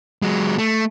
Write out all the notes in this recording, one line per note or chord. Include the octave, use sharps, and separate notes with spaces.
F#3 G#3
A3